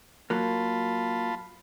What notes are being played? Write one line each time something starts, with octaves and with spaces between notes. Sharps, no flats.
F#3 A#3 F4 A5 B5